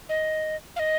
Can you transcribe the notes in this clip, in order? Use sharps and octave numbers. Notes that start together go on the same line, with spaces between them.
D#5
F5
D#5